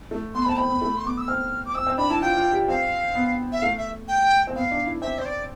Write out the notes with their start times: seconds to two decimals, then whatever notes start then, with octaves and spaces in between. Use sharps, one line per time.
0.11 A3
0.34 B3 C6
0.42 B5
0.46 C4
0.49 A5
0.57 C4 B5
0.70 B3
0.82 A3
0.97 C6
1.04 B3 D6
1.18 E6
1.28 C4 F6
1.66 D6
1.75 C4 E6
1.87 C4
1.98 D4 B5
2.10 E4 A5
2.21 F4 G5
2.37 F4
2.53 G4
2.68 C4 F5
3.15 B3
3.52 E5
3.62 A3 F5
3.77 E5
4.08 G5
4.47 C4
4.55 B3 F5
4.71 D4
4.86 E4
5.02 C4 E5
5.19 C5
5.25 D5